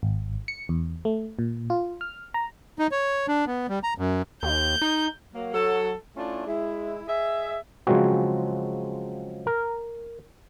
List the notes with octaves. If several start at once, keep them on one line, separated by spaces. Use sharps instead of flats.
G#1
C#7
E2
A3
A#2
F4
F6
A#5
D#4
C#5
D4
B3
G3
A#5
F#2
D#2 G6
D#4
F#3 A#3
F#3 A4
A3 C#4 D4 E4 F4
G#3 E4
G#4 D#5 E5
C#3 F3 F#3 G#3 C4 F#4
A#4